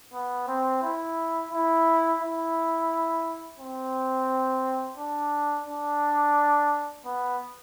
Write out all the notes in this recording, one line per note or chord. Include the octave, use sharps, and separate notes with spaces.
B3
C4
E4
E4
E4
C4
D4
D4
B3